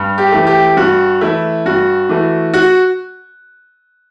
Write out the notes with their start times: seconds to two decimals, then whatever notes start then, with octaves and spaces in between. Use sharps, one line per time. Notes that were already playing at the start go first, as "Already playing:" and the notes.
Already playing: G2
0.18 G4
0.32 E3 A3
0.47 G4
0.77 G2 F#4
1.21 E3 A3 E4
1.65 G2 F#4
2.09 E3 A3
2.54 F#4